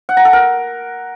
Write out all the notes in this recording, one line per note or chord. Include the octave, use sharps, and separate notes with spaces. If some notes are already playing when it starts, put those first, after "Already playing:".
F#5
A#5
A4
A#4